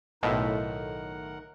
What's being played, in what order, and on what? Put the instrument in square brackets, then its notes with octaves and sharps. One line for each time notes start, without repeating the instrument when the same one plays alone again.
[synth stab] B1 A2 [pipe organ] D#3 A#4 F#5 [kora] D#4 F4 E5